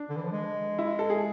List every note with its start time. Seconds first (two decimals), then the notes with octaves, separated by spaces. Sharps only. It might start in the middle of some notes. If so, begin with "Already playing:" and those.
Already playing: D4
0.09 D3
0.17 E3
0.24 F3
0.32 G#3
0.79 E4
0.99 A4
1.10 G#4